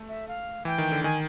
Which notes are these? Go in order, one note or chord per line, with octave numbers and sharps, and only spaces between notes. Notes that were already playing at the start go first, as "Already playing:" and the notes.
Already playing: A3
E5
F5
E3 G5
D#3
D3
D#3 G#5